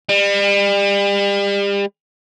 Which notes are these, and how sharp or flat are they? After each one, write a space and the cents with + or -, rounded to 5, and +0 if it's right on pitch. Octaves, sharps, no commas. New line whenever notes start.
G3 +35